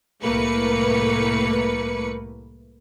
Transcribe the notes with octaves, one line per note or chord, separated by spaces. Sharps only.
C2 A2 A3 A#3 B4 C#7